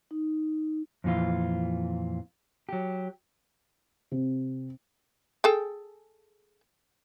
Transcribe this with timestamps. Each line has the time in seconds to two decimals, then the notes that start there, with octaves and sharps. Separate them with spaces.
0.11 D#4
1.04 F2 A#2 E3 F4
2.69 F#3 G4
4.12 C3
5.44 G#4 A4 G5